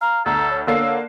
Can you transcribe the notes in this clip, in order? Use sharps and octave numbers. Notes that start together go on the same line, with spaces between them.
F5 A#5
D2 A4 A#5
C#5
D3 A#3 C#5 E6 C7
C#5